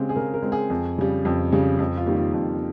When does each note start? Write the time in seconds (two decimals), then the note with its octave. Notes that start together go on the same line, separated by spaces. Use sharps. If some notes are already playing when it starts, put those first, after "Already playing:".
Already playing: C#3 G#3 C4 G4
0.09 G#4
0.16 C#3 A#4
0.34 A#4
0.43 G#3 C4
0.52 G#4
0.70 F2
0.98 C#3 G3
1.25 F2
1.52 C#3 G3
1.79 F2
1.97 F4
2.06 D#3 G3 A#3
2.16 F4
2.33 F2